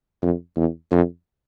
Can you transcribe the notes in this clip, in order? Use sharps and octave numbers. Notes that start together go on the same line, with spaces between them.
F2
E2
F2